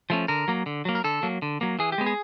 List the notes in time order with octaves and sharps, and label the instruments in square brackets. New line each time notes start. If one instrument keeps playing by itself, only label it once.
[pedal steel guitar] F3 A3 C#4
D3 A#4
F#3 A#3
D3
F#3 A#3
A#4
D3 A4
F#3 A#3
D3
F#3 A#3
E3 G#4
G4
G#3 B3
G#4